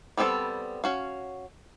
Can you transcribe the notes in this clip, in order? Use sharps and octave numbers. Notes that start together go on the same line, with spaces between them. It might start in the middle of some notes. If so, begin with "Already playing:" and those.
G3 B3 C4 G#4 A4
C#4 F#4 F5